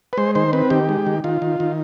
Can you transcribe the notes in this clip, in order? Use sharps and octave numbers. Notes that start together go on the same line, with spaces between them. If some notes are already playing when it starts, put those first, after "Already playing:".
B4
G#3 C5
D#3 C5
C4 B4
D#3 G4
G#3
D#3
D#3 F4
D#3
D#3